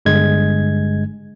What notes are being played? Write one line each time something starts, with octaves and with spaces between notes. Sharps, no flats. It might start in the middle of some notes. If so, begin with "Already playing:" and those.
G1 G2 G#3 G#6